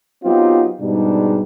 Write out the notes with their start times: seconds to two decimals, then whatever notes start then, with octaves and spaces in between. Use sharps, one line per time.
0.24 F#3 B3 C4 D#4 F4 G4
0.80 G#2 B2 G3 G#3 D4 D#4